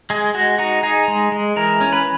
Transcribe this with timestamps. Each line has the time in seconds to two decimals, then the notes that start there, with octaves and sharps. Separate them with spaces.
0.10 G#3 G#4
0.34 G#3 F#4
0.58 D#4 F#4
0.83 D#4 G#4
1.08 G#3
1.32 G#3
1.56 E3 A#4
1.81 C#4
1.93 B4